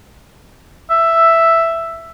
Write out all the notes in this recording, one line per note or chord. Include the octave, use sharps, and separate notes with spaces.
E5